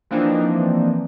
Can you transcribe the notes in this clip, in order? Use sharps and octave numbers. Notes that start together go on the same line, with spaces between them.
E3 F3 A#3 C4 D4 D#4